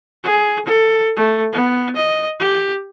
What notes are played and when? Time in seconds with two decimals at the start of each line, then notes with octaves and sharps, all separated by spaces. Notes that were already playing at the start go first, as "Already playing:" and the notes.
0.23 G#4
0.65 A4
1.16 A3
1.53 B3
1.96 D#5
2.40 G4